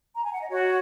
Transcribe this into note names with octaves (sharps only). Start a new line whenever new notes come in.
A#5
G#5
F#5
D#5
F#4 C#5